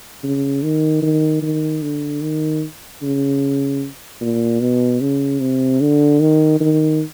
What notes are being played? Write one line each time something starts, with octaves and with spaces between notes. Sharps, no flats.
C#3
D#3
D#3
D#3
D3
D#3
C#3
A#2
B2
C#3
C3
D3
D#3
D#3